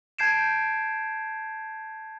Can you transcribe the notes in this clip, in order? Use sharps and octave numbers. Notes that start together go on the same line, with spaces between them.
A5 G6 G#6 C7 D7 E7